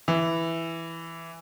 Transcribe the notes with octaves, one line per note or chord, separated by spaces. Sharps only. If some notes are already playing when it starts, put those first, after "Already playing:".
E3